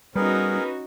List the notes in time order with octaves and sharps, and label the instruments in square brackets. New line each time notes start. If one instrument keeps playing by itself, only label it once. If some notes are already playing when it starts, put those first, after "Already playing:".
[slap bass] G3 [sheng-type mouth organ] B3 G#4 A#4 [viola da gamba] C#4 D#4 F#4 [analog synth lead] B4